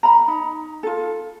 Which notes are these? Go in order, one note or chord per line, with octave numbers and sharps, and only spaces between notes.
A#5 B5
D#4
F4 A4